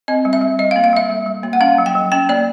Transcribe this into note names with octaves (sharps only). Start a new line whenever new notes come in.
C4 D#5
G3
E5
G3
G3 D#5
F5
A#3
F5
G3 E5
G3
G3
A#3
F#5
C#4 F5
F#3
G5
F#3
C#4 G5
A#3 D5